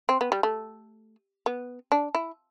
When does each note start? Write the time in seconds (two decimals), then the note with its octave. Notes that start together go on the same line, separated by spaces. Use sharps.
0.09 C4
0.21 B3
0.32 G3
0.43 A3
1.46 B3
1.92 D4
2.15 E4